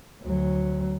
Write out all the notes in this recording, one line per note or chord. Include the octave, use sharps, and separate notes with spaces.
D2 F#3